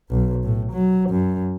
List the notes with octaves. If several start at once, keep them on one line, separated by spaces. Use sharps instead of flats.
B1
A2
F#3
F#2